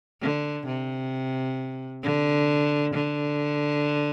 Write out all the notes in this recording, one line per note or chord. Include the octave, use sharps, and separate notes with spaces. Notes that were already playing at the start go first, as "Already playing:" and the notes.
D3
C3
D3
D3